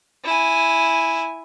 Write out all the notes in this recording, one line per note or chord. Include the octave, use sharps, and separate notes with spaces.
E4 G#5